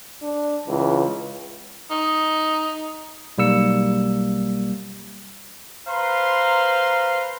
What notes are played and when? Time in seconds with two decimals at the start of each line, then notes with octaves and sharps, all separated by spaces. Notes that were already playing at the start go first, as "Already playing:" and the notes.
0.22 D4
0.68 C#2 E3
1.90 D#4
3.38 B1 G3 A#3 E6 C#7
5.87 B4 C5 F5 A#5 C6